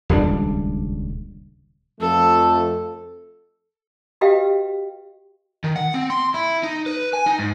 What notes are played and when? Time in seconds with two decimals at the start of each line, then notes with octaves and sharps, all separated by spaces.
0.09 D#1 C#2 G3 D4
2.00 F2 F3 A3 A4
4.21 F#4 G4 B4 D#5 F5 G5
5.64 D#3
5.76 F#5
5.94 C4
6.10 C6
6.34 E4
6.63 D#4
6.86 B4
7.13 G#5
7.26 D#4
7.39 G#2